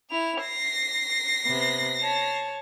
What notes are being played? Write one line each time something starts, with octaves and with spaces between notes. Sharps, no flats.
E4 F7
A#6 C7
C3 B3
C#5 A5